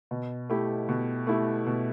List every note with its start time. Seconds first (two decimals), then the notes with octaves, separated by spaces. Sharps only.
0.11 B2
0.50 A3 E4 G4
0.89 B2
1.27 A3 E4 G4
1.66 B2